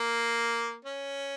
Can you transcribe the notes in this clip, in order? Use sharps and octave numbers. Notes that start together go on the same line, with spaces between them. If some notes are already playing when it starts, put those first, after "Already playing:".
Already playing: A#3
C#4